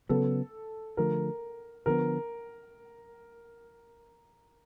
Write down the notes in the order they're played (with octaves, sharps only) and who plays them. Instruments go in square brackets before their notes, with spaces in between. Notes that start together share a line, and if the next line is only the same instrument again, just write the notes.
[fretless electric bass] C#3 F#3 B3 [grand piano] A4
[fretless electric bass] D3 F3 A3 [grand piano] A#4
[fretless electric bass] D3 F3 G#3 B3 [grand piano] A#4